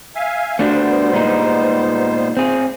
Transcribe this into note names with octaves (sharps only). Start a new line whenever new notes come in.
E5 F5 G#5
G3 A3 B3 D4 F#4 C5
A#2 G#3 D#4
C4 G#4